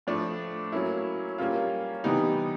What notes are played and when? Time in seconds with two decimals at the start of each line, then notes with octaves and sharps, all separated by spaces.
0.07 A2 F3 A3 D4
0.72 F#3 A#3 C#4 E4
1.38 G3 A#3 C#4 F4
2.04 C3 E3 G3 B3 D#4